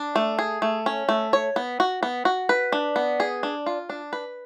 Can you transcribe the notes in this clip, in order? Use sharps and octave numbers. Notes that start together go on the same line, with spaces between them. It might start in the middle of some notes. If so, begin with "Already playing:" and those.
Already playing: D4
A3
G#4
A3
C#4
A3
C#5
B3
F#4
B3
F#4
B4
D4
B3
G#4
D4
F4
D4
B4